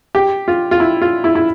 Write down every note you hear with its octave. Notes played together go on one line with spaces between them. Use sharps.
G4
F4
F4
E4
F4
E4
E4